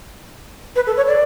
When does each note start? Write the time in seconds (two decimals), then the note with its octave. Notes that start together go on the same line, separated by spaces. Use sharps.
0.76 B4
0.87 A4
0.97 C#5
1.07 D5